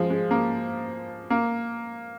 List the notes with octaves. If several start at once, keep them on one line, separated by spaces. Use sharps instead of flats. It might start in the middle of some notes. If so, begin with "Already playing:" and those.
Already playing: F3 G#3
G#3
A#3
A#3